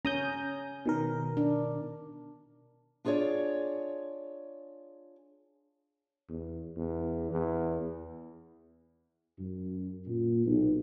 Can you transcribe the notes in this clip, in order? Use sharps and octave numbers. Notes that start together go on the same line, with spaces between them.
C#4 A#5 D#6 G6
B2 D#3 A#4
D4
D4 F4 G#4 B4 C#5 D5
E2
E2
E2
F#2
A#2
B1